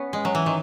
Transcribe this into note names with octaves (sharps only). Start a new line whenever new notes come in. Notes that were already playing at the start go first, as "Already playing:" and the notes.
Already playing: B3 C#4
G#3
F#3
E3
D#3